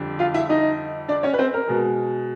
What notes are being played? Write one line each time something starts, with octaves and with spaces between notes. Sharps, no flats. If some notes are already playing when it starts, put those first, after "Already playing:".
Already playing: F2 D3 G3
F4 F5
E4 E5
D#4 D#5
D4 D5
C#4 C#5
B4
C4 C5
A#4
B2 G#3